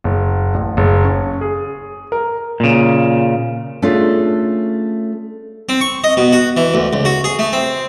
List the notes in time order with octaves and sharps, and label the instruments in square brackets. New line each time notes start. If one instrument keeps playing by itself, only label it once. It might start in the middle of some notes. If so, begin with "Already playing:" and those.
[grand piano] F#1
A1
F#1
C#4
G#4
A#4
[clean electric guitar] A#2 C#3
[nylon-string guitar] A3 C#4 D4 F4 G#4 A4
[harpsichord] C4
C#6
D#5
B2
F#4
E3
D2
C#2
F#4
G#4
A3
C4